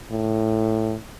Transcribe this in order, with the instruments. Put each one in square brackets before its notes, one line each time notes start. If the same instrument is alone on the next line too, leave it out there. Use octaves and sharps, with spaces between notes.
[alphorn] A2